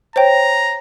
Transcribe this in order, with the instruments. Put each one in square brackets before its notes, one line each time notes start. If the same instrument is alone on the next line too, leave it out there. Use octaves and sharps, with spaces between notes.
[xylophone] C5 C#5 G5 [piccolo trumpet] A#5